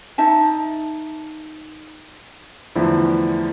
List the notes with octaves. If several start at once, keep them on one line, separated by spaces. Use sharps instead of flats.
D#4 E5 A5
E2 D3 F3 A3 E4